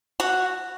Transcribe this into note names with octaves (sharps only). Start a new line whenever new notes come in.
F#4